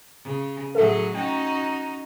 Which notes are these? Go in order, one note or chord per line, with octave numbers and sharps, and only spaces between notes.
C#3
A2 F#3 G#4 A4 E5
C#4 D#4 F#4 G5